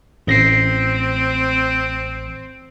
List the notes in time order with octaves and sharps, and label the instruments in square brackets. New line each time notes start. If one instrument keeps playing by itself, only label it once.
[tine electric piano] A1 A#6 C7 [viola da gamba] C4